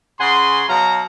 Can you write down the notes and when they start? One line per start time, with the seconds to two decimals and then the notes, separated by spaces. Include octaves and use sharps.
0.20 C#3 F#5 G#5 C6
0.69 B2 F#3 F5 A#5